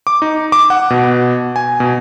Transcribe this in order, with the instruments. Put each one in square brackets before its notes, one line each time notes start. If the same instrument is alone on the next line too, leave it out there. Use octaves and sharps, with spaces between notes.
[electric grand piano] D6
D#4
D6
F#5
B2
G#5
B2